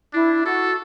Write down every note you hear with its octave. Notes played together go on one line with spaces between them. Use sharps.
D4 E4
F#4 A4